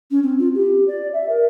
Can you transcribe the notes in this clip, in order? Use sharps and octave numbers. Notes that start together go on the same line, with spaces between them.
C#4
C4
F4
G4
D5
E5
A#4